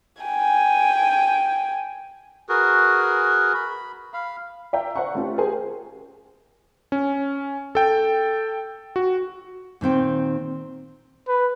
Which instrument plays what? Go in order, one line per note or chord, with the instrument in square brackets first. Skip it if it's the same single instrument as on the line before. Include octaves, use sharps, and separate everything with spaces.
[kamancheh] G5 G#5
[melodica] F#4 G#4 A#4 B4
B5
F5 B5
[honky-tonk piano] D5 E5 F5 G5 A#5
C5 E5 F#5 A#5 C#6
A3 C#4 F4 G4
G4 G#4 A#4 C5 G#5
[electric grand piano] C#4
A4 G5
F#4
[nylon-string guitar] A#2 D#3 C4 G5
[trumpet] B4